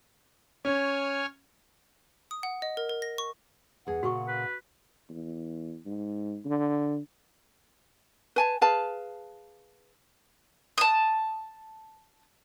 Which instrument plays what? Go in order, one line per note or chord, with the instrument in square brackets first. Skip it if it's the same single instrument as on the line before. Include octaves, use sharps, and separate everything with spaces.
[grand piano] C#4 [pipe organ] C#5 G#5 F6
[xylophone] D#6
F#5
D#5
A#4
A#4
A#6
C#6
[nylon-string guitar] E2 G#4 [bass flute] F#5
[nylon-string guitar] A#2 C#3 [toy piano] F#4 C#6
[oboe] B4
[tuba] E2
G#2
D3
[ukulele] B4 G#5 A5
G#4 B4 F5 A5
[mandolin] A5 D#6